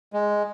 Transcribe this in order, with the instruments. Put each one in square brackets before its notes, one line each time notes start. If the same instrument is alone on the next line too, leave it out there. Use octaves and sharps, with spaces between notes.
[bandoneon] G#3